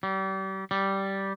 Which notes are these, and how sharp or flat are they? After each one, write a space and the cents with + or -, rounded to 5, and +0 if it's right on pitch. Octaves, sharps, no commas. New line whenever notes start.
G3 -35
G3 -10